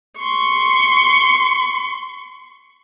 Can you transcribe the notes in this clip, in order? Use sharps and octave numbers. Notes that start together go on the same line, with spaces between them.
C6 C#6